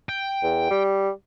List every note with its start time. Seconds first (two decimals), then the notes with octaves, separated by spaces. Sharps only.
0.09 G5
0.43 E2
0.70 G3